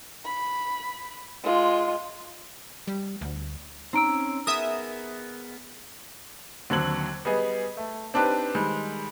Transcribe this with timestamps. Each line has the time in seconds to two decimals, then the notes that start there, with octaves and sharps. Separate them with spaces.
0.25 B5
1.44 G#3 F4
2.88 G3
3.21 D2
3.93 C4 C#4 D#4 A#5 E6 D7
4.47 B3 G#4 A#4 E5 D#6
6.70 D#2 D3 F#3 C4 G#6 F#7
7.25 G3 B3 G#4 D#5
7.77 A3
8.14 C4 D4 D#4 G4 B4
8.55 D#3 G3 G#3